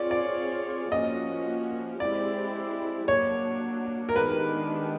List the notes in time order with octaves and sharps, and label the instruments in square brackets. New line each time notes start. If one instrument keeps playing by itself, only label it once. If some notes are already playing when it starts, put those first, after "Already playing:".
Already playing: [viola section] C4 F4 G#4 C#5 [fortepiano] D5
[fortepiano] D5
[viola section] F3 A#3 C#4 F#4 [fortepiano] D#5
[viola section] G#3 C4 E4 G4 [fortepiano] D5
[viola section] F#3 A#3 D4 [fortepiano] C#5
[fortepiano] A#4
[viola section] D#3 G#3 B3 D4 G4 [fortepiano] B4